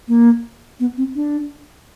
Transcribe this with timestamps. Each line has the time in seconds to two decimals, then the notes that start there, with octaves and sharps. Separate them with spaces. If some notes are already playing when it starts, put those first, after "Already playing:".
0.08 A#3
0.80 B3
0.97 C4
1.15 D4